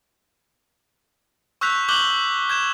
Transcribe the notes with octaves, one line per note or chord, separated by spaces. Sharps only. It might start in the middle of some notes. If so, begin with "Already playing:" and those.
C#6 E6 F#6 G6 B6 F7
C#6 D6 F#6 G6 F#7 G7
G6 G#6 E7